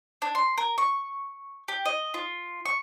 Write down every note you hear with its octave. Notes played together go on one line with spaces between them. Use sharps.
D4
C6
A#4
C#6
G4
D#5
F4
C#6